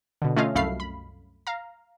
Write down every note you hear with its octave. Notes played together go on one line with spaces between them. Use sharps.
B2 D3
A3 C#4 F4 C#5 D#5 F5
C2 F#2 A3 F5 B5 C7
B5
F5 A#5